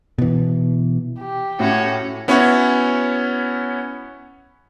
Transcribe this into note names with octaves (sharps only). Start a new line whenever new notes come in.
B2 E3
G4
A2 C#4 F#4
B3 C#4 E4 F#4 C#5 F#5